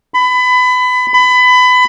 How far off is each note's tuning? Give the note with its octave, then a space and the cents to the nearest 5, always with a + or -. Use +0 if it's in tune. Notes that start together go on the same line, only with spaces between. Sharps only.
B5 +25
B5 +25